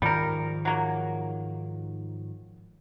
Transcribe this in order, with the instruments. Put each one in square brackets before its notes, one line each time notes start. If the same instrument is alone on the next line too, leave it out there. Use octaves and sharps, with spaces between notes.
[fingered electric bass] G#2 D#3 F3 [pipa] G3 A#4
[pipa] F#3 A#3